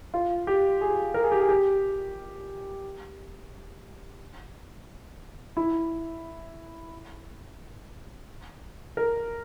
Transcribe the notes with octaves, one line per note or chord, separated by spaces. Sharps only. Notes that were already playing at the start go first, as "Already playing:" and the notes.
F4
G4
G#4
A#4
G#4
G4
G#4
G4
E4
A#4